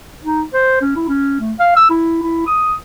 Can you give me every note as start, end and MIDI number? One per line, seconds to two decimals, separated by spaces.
0.23 0.42 63
0.54 0.79 72
0.81 0.92 61
0.96 1.06 64
1.08 1.39 61
1.40 1.53 57
1.59 1.75 77
1.76 1.88 88
1.90 2.19 64
2.23 2.43 64
2.47 2.72 87